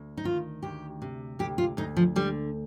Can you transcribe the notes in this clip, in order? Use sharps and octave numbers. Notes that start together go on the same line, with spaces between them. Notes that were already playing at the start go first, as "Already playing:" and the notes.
Already playing: D2
D#4
D#3 F4
D2 G4
C3
D2 G4
F4
D2 D#4
F3
D3 G3